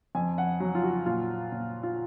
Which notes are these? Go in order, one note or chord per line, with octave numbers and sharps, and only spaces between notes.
F2 G#5
F#5
F#3
F4
F#4
A#2 F4
A#2
F4